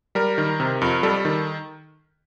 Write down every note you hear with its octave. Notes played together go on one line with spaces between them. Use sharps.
G3 A#4
D#3
C3
F2
G3 A4
D#3